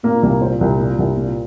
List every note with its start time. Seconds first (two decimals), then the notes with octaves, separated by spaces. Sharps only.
0.03 A#2 A#3
0.23 C2 A#3
0.41 A#2 C5
0.61 C2
0.79 A#2
0.99 C2
1.17 A#2